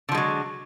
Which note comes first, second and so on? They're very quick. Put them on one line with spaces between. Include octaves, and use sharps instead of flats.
D3 F3 G#3 F#3